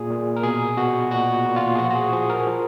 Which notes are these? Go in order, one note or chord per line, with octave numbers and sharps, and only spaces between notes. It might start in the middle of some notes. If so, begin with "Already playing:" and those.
Already playing: A#2 G#4
A#2
A#4
B2 G#4
B2 F#4
A#2 F#4
A#2
F4
G#4
F3 F#4
F#4
G#4
F3 G#4
A#4
F3